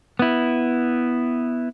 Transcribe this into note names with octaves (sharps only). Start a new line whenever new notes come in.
B3 E4